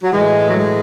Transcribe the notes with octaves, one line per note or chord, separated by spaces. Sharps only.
F#3
A2 E3 G#3
F#3
G#3